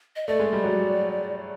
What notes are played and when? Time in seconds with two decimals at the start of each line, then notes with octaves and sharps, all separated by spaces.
0.16 D#5
0.27 A3 D5
0.40 G#3
0.53 G3
0.64 F#3 G#3